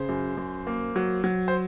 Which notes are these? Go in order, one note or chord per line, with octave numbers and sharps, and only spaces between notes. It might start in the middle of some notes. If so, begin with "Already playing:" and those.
Already playing: C#3 C5
F#2
F#2
A#3
F#3
F#3
C5